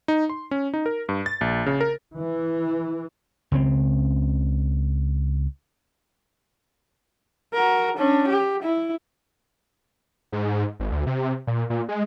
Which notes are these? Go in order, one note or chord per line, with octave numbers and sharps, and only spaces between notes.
D#4
C6
C#4
D#4
A#4
G2
A6
A#1
C#3
A#4
E3
C#2 C#3 C4
F#4 A#4
C#4 D4
G4
E4
G#2
G#1
D2
C3
A#2
A#2
G#3